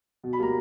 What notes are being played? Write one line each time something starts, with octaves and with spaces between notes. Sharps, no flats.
B2
B5
G3 A#3 A#5